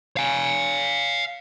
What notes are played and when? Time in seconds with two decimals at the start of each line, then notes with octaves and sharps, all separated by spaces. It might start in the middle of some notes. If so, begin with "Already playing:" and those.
0.17 F5 G#5